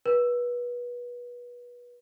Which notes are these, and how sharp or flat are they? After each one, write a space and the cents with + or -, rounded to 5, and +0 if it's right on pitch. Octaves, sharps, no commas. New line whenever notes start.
B4 -25